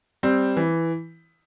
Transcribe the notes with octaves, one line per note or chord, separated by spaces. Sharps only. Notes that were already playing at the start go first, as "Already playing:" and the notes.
G3 C4
E3